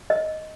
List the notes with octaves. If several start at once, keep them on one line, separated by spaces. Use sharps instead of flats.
D#5